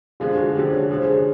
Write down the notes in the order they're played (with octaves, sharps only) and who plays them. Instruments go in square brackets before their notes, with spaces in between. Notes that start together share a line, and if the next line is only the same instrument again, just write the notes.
[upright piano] D3 F3 G#3 [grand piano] F4
[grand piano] F#4
[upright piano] D3 F3 G#3 [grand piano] G4
[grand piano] C#5
[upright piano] D3 F3 G#3
[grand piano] C5
G#4
C#5